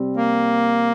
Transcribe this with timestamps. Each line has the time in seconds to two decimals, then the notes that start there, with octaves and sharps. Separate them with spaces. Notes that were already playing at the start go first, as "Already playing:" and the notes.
Already playing: C3 G3 C4
0.17 A#3